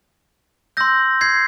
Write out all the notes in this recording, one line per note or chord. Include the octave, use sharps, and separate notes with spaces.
C6 E6 G6 A#6
G#6 C7